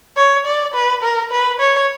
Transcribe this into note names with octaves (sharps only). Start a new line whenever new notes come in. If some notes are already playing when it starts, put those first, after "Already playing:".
C#5
D5
B4
A#4
B4
C#5